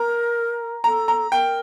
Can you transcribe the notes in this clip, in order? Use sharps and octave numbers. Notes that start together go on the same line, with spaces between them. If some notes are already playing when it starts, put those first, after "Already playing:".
Already playing: A#4 A#5
A4 A#5
A#5
A#4 G5